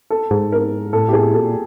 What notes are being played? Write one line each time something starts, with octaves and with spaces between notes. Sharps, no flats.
A4
G#2
A#4
A2 A4
G4
G#4
A#2 A4